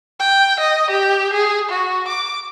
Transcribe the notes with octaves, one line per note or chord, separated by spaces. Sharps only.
G5
D#5
G4
G#4
F#4
D6